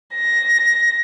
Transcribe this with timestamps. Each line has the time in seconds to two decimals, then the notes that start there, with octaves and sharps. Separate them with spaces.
0.15 A#6